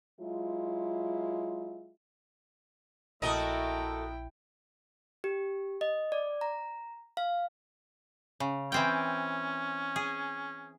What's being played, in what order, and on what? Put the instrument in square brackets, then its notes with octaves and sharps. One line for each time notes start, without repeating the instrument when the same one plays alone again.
[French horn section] F#3 G#3 E4 F4
[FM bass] A#1 [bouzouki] A3 A4 [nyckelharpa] E4 G5 [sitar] F#4 A#4 D#5
[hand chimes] G4
D#5
D5
A#5
F5
[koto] C#3
[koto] E3 C4 G5 [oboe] C#4
[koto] G#4